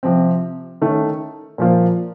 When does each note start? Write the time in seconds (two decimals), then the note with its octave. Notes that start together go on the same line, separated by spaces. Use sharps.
0.03 C3 F3 C4
0.82 D#3 A3 C#4
1.58 A#2 F3 A#3 F4 C5